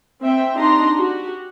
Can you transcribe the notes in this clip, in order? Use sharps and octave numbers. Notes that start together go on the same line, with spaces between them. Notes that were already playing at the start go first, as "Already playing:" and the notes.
C4 E5 G5
D4 D#4 G4 A#5 C6
F#4 G4